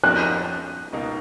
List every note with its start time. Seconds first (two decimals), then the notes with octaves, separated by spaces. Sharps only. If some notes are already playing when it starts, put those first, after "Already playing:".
0.03 F2 F3 A#3 C#4 F#4 F#6
0.93 C#2 B2 A#3 D#4